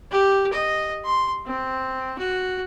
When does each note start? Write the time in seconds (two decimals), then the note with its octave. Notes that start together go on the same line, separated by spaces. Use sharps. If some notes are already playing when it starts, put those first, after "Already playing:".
0.11 G4
0.53 D#5
1.05 C6
1.46 C4
2.19 F#4